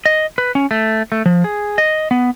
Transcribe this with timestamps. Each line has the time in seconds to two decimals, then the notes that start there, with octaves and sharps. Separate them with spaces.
0.06 D#5
0.38 B4
0.55 C#4
0.71 A3
1.12 A3
1.26 F3
1.44 G#4
1.78 D#5
2.11 B3